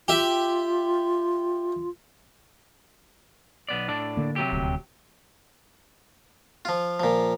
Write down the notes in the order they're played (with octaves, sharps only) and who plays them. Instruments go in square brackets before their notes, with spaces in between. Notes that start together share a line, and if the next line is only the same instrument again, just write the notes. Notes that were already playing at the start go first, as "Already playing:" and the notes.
[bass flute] F4 [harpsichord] G4 E5
[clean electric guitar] B1 B3 D5
A2 D4 D5
[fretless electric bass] D3 A#3
[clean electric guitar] C3 F#3 G4
[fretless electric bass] D#1 D2
[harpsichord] F3 F4
A#2 F3